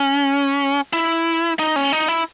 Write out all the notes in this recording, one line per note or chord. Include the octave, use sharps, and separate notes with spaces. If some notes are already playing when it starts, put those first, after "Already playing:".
Already playing: C#4
E4
D#4
C#4
D#4
E4